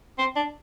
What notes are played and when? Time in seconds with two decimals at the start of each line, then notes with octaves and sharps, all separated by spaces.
0.18 C4
0.36 D4